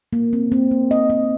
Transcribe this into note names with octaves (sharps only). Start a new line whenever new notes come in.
A#3
C4
C4
A#3
D#5
C4